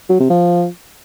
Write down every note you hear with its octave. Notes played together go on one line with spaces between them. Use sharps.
F#3
C3
F3